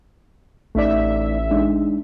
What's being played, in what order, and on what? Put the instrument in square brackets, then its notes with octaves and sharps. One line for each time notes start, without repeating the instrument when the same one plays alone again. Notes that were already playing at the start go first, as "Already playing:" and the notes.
[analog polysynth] A1 E5 [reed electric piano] A3 D#4 D5
[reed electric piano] G#3 D4 D#4